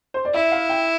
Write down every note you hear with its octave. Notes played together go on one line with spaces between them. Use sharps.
C5
D5
E4 E5
F5
G5